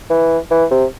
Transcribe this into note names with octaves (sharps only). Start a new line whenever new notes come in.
E3
E3
C3